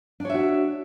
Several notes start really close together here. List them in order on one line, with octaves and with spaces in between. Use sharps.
D4 C#5 E5 F#4